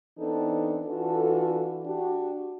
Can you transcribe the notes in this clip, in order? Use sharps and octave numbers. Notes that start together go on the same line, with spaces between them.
E3 B3 C4 D4 D#4 A4
E3 D4 F4 F#4 A4
D4 F#4 G4